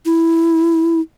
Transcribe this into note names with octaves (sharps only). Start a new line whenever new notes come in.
E4